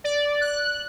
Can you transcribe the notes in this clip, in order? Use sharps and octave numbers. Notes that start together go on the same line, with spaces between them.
D5
F#6